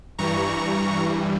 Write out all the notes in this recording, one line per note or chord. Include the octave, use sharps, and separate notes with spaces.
G2 E3 G3 A#5 C#6